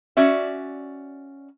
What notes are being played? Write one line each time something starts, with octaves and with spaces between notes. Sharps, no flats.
C#4 F#4 D5 E5